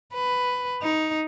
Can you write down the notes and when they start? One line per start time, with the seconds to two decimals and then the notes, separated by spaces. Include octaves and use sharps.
0.14 B4
0.82 D#4